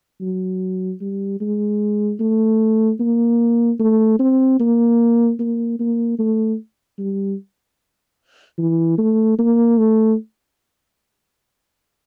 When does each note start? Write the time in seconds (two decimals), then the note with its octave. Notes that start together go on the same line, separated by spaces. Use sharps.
0.21 F#3
1.01 G3
1.41 G#3
2.20 A3
3.00 A#3
3.79 A3
4.19 C4
4.60 A#3
5.39 A#3
5.80 A#3
6.19 A3
6.98 G3
8.58 E3
8.98 A3
9.39 A#3
9.78 A3